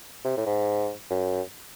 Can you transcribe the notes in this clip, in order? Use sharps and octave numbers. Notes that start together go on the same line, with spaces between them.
C3
A2
G#2
F#2